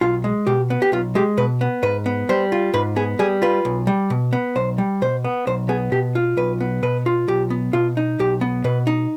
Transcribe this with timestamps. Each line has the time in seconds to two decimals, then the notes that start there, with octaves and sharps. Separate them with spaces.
0.01 B1 F4
0.24 G#3
0.47 B2 G4
0.70 B3
0.82 G4
0.92 B1 F4
1.15 G#3 G4
1.37 B2 B4
1.61 B3
1.83 G#2 B4
2.06 B3
2.29 G3 C5
2.52 F4
2.74 G#2 B4
2.96 B3 G#4
3.19 G3 G#4
3.42 F4 B4
3.65 B1
3.87 G3
4.10 B2
4.33 B3
4.56 B1 C5
4.78 G3
5.02 B2 C5
5.24 B3
5.47 B1 C5
5.69 B3 G#4
5.92 B2 G4
6.15 F4
6.37 B1 B4
6.60 B3
6.83 B2 B4
7.06 F4
7.28 B1 G4
7.50 B3
7.73 B2 F4
7.97 D#4
8.19 B1 G4
8.41 B3
8.64 B2 B4
8.87 D#4